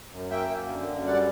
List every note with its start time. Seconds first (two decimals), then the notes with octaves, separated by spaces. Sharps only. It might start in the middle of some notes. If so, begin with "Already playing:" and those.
0.12 F#2
0.31 A#3 E5 G5
0.49 F#2
0.69 D3
0.88 F#2
1.06 G3 D5 F#5